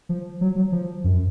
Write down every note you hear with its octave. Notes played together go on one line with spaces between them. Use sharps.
F3
F#3
F#3
F3
F#2